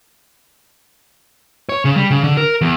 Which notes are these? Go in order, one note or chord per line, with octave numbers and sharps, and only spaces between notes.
C#5
C#3
G3
C#3
D3
A#4
E2